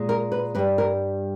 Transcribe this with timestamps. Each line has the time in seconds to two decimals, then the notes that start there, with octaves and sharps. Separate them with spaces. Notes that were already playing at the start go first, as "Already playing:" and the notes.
Already playing: A#2 G#3
0.09 A#4
0.32 B4
0.55 G2 G3 B4
0.78 A#4